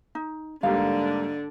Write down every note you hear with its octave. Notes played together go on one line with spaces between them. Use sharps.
D#4
G#2 D3 G3 A#3 D4 F5